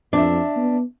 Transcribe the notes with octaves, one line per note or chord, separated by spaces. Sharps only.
F2 D4 E5
B3